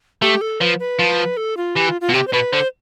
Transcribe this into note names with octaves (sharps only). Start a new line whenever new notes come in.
A3 G4
A4
F3 B4
B4
F3
A4
F4
E3 G4
F4
F4
B2
C3 G4
C5
B2 B4
D3 C5